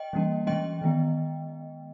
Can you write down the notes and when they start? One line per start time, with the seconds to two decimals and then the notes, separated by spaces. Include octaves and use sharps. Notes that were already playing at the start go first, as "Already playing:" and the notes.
Already playing: D#5 G5
0.13 E3 G3 A#3 C#4
0.47 E3 G#3 C#4 D#5 G5
0.82 D#3 G#3 B3